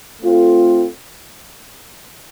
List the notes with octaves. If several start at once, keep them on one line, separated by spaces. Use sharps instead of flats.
A3 C4 F4 A4